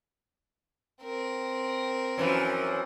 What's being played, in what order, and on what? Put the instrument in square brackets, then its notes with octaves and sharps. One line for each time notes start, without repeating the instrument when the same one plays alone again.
[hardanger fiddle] C4 A#4
[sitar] F#2 E3 F3